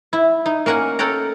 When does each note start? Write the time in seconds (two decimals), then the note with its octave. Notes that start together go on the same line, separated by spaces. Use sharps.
0.13 E4
0.46 D#4
0.66 A#3 C#4 A#4 F#5 G#5
0.99 A4 A#4 C#5 F#5 G5 A#5